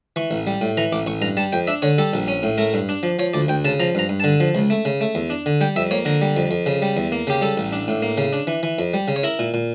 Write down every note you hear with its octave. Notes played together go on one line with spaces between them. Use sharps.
E3 C#6
A1
G3
A2
E3 A#5
A1 D6
A1 C#6
G2 A#5
G3 A5
F2 G5
D4 E5
D3 C#5
G3 A4
A#1
C#4
A2
A3 A#4
G2
D4
F3
F3 C#5
D2 D5
D2 G5
C#3 A5
F3 A#5
G2 A#5
G2
D3 A5
F3
C#2
A3
C#3
A3
E2
D4
D3
G3 G5
F2 E5
A#3 C#5
D3 A#4
G3
F2
F2
C#3
G3
E2
A#3
C#3 G4
G3 A4
A1
D4
A2
A#3
C#3
D4
E3
E3
F2
G3
C#3
C#5
E4 A#4
A#2
A#2